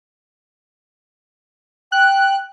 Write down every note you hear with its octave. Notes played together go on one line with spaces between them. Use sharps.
G5 F#6